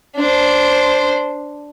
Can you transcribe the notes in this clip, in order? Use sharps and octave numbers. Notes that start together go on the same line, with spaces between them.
D4 C5